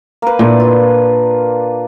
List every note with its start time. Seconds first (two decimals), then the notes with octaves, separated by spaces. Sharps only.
0.22 A#3 B4
0.39 A#2 E3 D4
0.60 F4